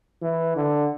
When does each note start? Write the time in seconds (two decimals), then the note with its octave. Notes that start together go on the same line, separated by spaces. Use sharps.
0.22 E3
0.56 D3